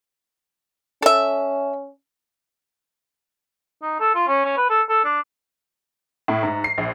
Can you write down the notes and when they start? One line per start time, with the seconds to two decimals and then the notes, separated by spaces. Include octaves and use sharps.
1.02 C#4 A4 E5
3.83 D#4
4.00 A4
4.15 F4
4.28 C#4
4.45 C#4
4.57 B4
4.70 A4
4.89 A4
5.04 D4
6.28 A2
6.43 G#2
6.64 C7
6.78 A#1